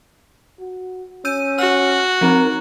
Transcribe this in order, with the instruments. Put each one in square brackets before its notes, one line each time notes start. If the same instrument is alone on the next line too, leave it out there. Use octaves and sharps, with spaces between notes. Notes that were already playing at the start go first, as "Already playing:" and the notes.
[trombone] F#4
[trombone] C#4 [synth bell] E6 G6 D#7
[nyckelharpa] F#4 [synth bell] F6
[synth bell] F3 C4 D#4 [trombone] A#4